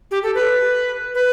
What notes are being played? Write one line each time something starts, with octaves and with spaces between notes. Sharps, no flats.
G4
A4
B4
B4